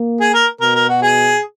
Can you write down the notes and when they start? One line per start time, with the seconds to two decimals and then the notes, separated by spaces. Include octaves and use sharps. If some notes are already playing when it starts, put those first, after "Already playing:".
Already playing: A#3
0.20 G#4
0.34 A#4
0.61 B2 A#4
0.75 A#4
0.88 F#4
1.02 G#4